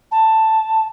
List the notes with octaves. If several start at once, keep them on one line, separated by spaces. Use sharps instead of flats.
A5